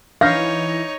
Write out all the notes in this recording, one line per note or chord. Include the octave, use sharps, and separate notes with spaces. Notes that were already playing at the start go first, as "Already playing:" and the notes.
E3 D#4 C#5 F5 G6 A#6